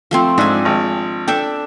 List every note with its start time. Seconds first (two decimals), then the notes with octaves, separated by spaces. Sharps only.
0.11 F3 A3 C4
0.38 G#2 D4 E5 G#5
0.65 G#1
1.28 D4 A4 E5 G5